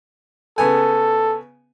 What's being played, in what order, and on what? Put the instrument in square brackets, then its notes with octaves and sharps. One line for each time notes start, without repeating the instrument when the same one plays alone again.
[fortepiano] C#3 B3 G#5 [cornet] A4